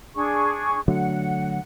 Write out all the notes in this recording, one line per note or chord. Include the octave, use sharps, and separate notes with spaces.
D4 G#4 C#6
D3 F#3 A3 F#5